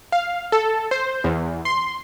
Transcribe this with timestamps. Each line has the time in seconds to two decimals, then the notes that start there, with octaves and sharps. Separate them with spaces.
0.12 F5
0.52 A4
0.91 C5
1.24 E2
1.65 C6